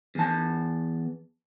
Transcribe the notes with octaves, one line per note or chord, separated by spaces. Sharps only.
E2 A5